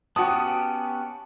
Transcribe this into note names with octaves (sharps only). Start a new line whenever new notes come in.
B3 C#4 F#4 G4 F#5 G5 A5 D#6